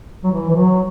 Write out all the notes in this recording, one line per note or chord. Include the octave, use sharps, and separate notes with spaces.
F#3
E3
E3
F#3